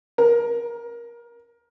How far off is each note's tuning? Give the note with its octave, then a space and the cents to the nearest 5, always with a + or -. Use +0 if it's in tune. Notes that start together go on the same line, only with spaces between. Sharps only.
A#4 +20